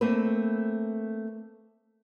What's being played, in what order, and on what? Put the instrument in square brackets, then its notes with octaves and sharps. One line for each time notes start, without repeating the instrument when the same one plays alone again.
[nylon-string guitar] A3 A#3 C4 B4